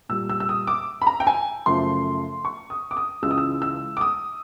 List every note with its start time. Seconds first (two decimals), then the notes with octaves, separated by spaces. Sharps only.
0.09 A#2 G3 E6
0.29 E6
0.40 E6
0.49 D#6
0.67 D6
1.02 B5
1.07 A#5
1.20 G5
1.27 G#5
1.66 F#2 C#3 F3 A3 C6
2.45 C#6
2.70 D#6
2.91 D6
2.97 D#6
3.22 C#2 C#3 E3 G#3 E6
3.31 D#6
3.38 E6
3.62 E6
3.97 D6
4.01 D#6